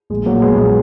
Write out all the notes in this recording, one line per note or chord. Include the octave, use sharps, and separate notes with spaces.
A#1 G#3
F#3 A#3
A#2
G#3 B3
A#1
G#3